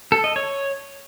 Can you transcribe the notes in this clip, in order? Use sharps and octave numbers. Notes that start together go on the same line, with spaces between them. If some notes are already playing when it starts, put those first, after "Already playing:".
A4
D#5
C#5